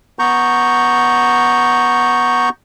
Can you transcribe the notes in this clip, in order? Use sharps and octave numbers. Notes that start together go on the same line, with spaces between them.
B3 A#5 C#6 G6